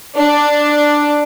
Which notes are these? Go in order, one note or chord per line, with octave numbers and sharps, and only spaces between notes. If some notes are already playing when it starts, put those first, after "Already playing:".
D4